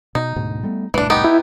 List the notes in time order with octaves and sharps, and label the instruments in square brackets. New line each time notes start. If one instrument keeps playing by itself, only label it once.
[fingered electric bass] B2 [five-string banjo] D#4
[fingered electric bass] D2 G#2 B2
G3 A3 B3
[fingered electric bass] D#1 C2 A2 [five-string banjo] E3 D4
[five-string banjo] B3 D#4 G4
[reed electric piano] E4